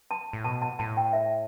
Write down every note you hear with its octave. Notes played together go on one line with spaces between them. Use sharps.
A5
A2
B2 A5
A5
A2 A5
G5
E5